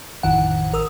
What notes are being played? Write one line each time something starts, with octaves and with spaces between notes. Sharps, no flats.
A1 F2 D#3 F#5
A#4 D#6 E6